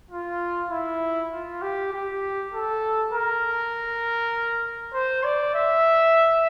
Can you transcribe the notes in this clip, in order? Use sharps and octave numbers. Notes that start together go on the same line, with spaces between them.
F4
E4
F4
G4
G4
A4
A#4
C5
D5
E5